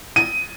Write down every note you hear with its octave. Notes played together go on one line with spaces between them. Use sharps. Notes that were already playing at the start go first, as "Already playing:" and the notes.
D#7